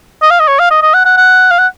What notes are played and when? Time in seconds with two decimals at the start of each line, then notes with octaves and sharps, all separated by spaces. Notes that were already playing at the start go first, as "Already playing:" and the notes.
0.22 D#5
0.30 F5
0.40 D#5
0.48 C#5
0.59 F5
0.71 D#5
0.82 D#5
0.94 F#5
1.05 F#5
1.17 F#5
1.51 F5
1.59 F#5